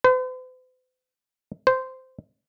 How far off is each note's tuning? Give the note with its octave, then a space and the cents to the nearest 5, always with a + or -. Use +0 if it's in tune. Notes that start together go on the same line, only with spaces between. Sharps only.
C5 -45
C5 -10